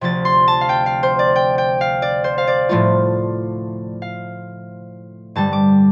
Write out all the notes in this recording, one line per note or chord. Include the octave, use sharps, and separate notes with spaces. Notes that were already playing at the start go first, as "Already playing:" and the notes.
D2 C3 F3 A6
C6
A5
F5
G5
F5
C5
D5
G5
G5
F5
D5
C5
F5
D5
A2 F3 A3 F4
F5
G2 D3 G3 A5
D6